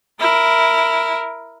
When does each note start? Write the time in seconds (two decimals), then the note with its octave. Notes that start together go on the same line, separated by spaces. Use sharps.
0.20 E4 A#4